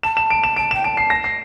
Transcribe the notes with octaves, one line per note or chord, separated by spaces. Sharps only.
A5 E7
E7
D7
E7
A5 D7
G5 E7
A5 D7
C7
A#6
C7